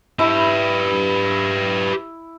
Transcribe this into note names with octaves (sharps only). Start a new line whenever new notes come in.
E4 G4 B4